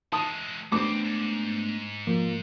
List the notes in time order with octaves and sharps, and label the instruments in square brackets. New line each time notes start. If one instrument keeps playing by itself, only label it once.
[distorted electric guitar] E3 G#3 [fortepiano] A5 D#6
[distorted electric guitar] E2 C4 [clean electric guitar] A3 B3 D4 [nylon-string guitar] B4 C5 [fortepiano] D6
[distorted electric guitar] G#2
[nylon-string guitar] F3 [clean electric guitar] A#3